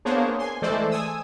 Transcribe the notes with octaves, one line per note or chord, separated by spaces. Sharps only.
A#3 B3 D4 G#4 C5 C#5
G#5 C6
E3 G#3 A3 A4 C5 D5
G#5 D#6 E6